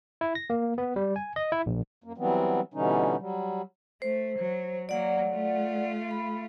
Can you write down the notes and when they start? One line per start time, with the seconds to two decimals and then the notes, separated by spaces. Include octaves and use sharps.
0.21 E4
0.35 A#6
0.50 A#3
0.78 B3
0.96 G3
1.16 G#5
1.36 D#5
1.52 E4
1.66 A#1
2.04 F#2 A#3
2.18 E3 F#3 G3 B3 C4
2.74 B2 D3 E3 G3 C#4 D#4
3.18 F#3 G3
4.02 A3 C5
4.38 F#3
4.89 F#3 A#3 D5 F#5
5.31 A3 F4
6.11 B5